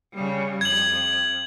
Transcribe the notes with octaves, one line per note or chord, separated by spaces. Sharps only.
C#3 G3
F2 G#6 F#7